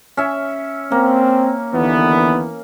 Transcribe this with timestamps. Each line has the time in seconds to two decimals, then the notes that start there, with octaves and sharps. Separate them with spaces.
0.17 C#4 E5
0.92 A#3 C4
1.74 D#2 D3 E3 B3